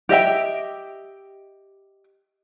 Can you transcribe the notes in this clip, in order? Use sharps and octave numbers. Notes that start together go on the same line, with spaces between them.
G4 D#5 E5 G5